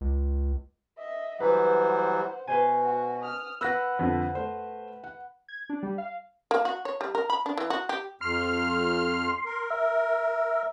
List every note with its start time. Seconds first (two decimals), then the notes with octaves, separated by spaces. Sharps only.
0.01 C#2
0.98 D#5 E5
1.40 E3 F#3 G3 B4 C5 F#5
2.48 B2 B4 C5 G#5
2.83 F#4
3.21 D#6 F6
3.61 B4 F#5 E6 F#6 A#6
3.99 F2 D3
4.35 A3 C5
5.04 F#5
5.48 G#6
5.69 D4
5.83 G3
5.98 F5
6.51 A#3
6.65 F#4
6.85 C#5
7.01 G3
7.15 A#4
7.30 B5
7.46 D4
7.58 E3
7.70 F#4
7.89 G4
8.21 F2 C6 F6
9.46 A#4
9.70 E5